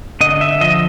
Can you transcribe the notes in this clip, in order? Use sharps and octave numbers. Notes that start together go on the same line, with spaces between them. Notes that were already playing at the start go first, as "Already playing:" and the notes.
D3 D#5
E5
F3 D#5